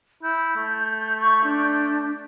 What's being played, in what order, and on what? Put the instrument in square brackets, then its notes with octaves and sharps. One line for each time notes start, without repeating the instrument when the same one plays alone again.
[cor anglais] E4 [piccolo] G6
[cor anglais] A3
[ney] C#6
D4